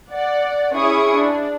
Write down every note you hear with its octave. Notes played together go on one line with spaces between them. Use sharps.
D5 F#5
C#4 E4 G#4 C#6 D#6
D4